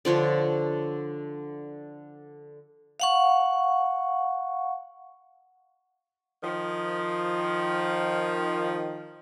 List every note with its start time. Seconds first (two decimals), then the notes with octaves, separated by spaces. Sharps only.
0.05 D3 F3 D4 C#5
3.00 F5 F#5 C#6
6.42 D#3 F3